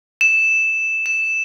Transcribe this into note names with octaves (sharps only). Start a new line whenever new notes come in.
E7
E7